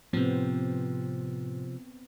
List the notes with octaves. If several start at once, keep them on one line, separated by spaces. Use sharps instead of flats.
A2 C3 F3 B3 C4